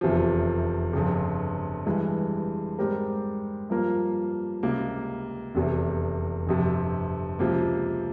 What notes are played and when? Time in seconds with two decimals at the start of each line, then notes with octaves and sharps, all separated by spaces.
0.01 F1 E2 C3 F3
0.93 G1 F2 C#3
1.86 G2 E3 G#3
2.79 G#2 G3 C4 G4 A#4
3.70 G2 F3 A#3 F4 A#4
4.63 C#2 C3 G3 A#3
5.55 F1 E2 C3
6.47 G1 F2 C3
7.39 C#2 C3 F3 A#3